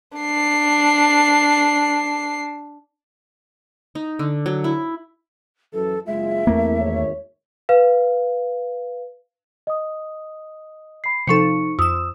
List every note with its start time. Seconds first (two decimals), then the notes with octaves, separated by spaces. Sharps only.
0.18 D4 C7
3.95 D#4
4.19 D3
4.46 F#3
4.64 E4
5.73 F#2 E3 A4
6.07 F#1 G#3 F4 E5
6.47 E2 A3 A#3 C4 E4 A#4
6.81 G#1 C#5
7.69 B4 F5
9.67 D#5 D#6
11.04 B5 C7
11.27 C3 F3 D#4 A4 C#6 C#7
11.79 F2 D#6 E6 E7